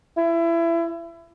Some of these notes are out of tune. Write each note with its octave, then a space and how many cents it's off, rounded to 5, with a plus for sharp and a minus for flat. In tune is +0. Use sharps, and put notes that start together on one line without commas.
E4 +25